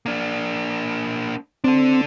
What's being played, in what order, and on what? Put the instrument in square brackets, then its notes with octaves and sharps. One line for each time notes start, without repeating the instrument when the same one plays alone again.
[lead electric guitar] A#3 D4
[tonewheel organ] C4 [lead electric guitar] D4 A4